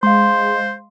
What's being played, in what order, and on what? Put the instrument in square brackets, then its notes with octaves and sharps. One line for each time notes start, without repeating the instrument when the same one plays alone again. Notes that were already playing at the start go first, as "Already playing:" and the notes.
[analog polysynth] G#3 [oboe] C5 [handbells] F5 C6